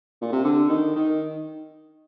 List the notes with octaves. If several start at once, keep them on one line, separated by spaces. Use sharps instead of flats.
A#2
C3
D3
D#3
D#3